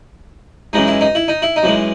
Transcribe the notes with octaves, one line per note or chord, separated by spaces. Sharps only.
F#2 E3 G#3 D#4
E4
D#4
E4
D#4
E4
D#4
F#2 E3 G#3